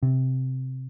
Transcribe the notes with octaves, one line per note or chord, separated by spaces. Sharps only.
C3